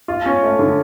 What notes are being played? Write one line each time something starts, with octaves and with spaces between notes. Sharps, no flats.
F4
C#4
A3
D3